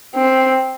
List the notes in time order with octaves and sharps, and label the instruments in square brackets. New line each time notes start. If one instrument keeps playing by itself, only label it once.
[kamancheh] C4